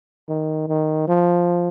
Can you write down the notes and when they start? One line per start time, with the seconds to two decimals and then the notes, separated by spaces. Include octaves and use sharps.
0.28 D#3
0.68 D#3
1.07 F3